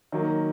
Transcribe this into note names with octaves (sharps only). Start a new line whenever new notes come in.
D#3 F#3 A#3